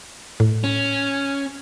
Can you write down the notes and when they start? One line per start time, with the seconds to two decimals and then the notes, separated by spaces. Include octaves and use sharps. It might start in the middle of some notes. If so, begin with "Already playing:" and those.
0.40 A2
0.64 C#4